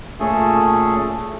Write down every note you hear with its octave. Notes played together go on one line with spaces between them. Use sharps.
A#2 A3 C#4 G#4 A4